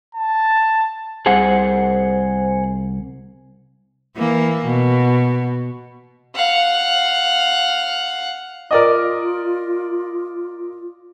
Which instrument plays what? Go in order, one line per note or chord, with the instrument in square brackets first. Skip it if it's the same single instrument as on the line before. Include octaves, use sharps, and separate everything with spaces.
[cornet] A5
[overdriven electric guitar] C2 [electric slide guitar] G#4 C5 F#5
[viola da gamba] E3 A#3
B2
[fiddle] F5 F#5
[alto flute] F4 [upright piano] A#4 D5 D#5